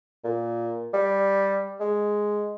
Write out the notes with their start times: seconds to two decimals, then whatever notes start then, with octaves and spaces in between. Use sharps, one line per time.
0.24 A#2
0.94 G3
1.80 G#3